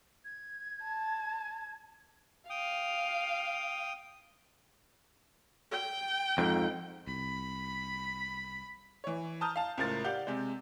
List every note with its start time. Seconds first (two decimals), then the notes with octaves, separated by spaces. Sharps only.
0.25 G#6
0.84 A5
2.50 F5 G5 D#6
5.71 G5
6.38 F2 G#2
7.07 C2 B5
9.04 E3 C#5
9.41 A5 A#5 D#6 F6 G6
9.56 F5 A5
9.78 C#2 A2 F4 A#4 C5 A6
10.04 G4 D5 F5 F#5 G6
10.27 C3 G#3